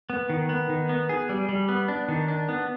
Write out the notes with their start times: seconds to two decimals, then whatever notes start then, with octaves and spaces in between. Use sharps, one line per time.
0.10 B3
0.30 D#3
0.49 B3
0.69 D#3
0.89 B3
1.09 G#4
1.29 G3
1.49 G3
1.69 B3
1.88 D4
2.08 D#3
2.28 D4
2.49 B3